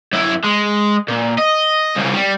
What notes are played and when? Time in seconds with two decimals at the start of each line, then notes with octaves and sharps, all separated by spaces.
0.13 F#2 E4
0.44 G#3
1.08 A#2
1.38 D#5
1.96 C2 C#3
2.14 G3